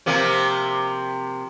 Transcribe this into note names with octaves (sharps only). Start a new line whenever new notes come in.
C3 F3 A#3